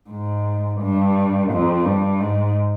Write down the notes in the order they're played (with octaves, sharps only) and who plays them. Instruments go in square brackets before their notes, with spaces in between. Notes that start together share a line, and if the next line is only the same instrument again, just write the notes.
[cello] G#2
G2
F2
G2
G#2